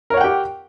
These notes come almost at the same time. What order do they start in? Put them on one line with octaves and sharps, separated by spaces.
A#4 C#5 F#5 G5 G4